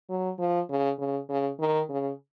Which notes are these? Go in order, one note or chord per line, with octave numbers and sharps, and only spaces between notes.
F#3
F3
C#3
C#3
C#3
D#3
C#3